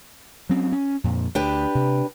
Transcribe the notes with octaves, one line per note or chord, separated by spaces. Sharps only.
F#3 C4 C#4
C#4
F2 A#2
D2 D4 G4 B4
C3